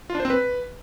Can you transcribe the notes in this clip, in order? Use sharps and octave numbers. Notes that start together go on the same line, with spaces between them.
F4
D4
C5
C4
B4